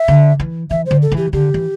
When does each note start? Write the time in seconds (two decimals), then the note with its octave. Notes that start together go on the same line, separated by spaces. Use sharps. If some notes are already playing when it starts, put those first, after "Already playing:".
Already playing: E5
0.08 D3
0.40 E3
0.70 E3 E5
0.86 D3 C5
1.02 A4
1.12 E3
1.17 G4
1.33 D3 G4
1.54 E3